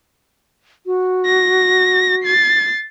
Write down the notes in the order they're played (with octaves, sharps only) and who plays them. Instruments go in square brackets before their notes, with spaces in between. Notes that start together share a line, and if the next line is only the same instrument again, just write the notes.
[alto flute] F#4
[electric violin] A#6
A6 C7